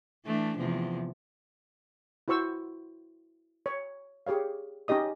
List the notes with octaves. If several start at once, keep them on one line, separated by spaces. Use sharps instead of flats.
E3 A3 D4
E2 C3 F3
E4 F#4 C5 C#6 E6
C#5
G4 G#4 C#5 F5
C#4 D#4 G4 D#5 D#6